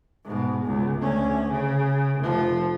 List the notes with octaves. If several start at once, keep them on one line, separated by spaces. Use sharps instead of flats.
G#2 B2
C#2
D2 C#4
C#3
F1 F3